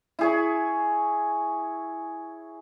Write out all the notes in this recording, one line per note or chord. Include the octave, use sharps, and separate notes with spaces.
E4 G#4 C#5